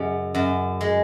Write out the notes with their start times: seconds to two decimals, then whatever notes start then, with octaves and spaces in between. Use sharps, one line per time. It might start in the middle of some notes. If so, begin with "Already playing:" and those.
Already playing: F#2 C#3 G#3
0.35 F#2
0.81 G#3